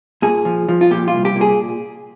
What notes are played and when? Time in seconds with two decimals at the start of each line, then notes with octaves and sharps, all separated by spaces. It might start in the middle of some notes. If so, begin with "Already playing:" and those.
0.22 A#2 G#4
0.45 F3
0.69 F3
0.81 F4
0.91 A#2 G4
1.08 F4
1.13 C2
1.25 G4
1.36 A#2
1.41 G#4